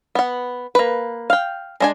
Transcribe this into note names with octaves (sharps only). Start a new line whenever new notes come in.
B3 F#5
A#3 B4
F5 G5
G#3 D4 G#5